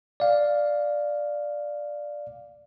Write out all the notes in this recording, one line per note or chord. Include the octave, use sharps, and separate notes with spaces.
D5 F5